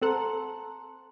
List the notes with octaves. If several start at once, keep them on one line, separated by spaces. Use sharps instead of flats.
C4 A4 F#5 A5 A#5 C6